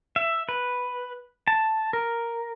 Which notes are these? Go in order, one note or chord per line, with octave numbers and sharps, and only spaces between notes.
E5
B4
A5
A#4